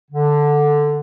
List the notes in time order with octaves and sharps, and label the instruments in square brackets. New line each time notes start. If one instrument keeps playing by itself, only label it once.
[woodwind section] D3